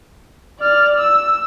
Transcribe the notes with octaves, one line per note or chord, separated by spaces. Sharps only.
D5 F6
E6